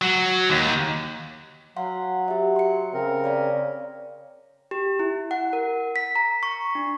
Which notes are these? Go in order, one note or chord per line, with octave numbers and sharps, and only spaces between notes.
F#3
D#2
F#3 F5 F#5 C6
G4 E5
C6 C#7
C#3 C4 A#4
C#5 D5 F5
G4
E4
F#5
A#4
B6
A#5
C#6
D4